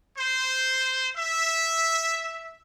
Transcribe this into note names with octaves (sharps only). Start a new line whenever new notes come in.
C5
E5